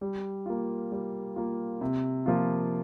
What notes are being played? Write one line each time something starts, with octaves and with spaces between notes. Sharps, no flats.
G3
A#3 F4
G3
A#3 F4
C3
F3 A#3 F4